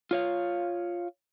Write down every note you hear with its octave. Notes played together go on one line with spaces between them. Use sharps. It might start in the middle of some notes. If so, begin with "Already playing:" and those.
F4 C#5 F5